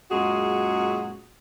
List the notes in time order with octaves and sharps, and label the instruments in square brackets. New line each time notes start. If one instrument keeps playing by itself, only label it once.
[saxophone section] F#2 A#2 G#3 F#4 G#4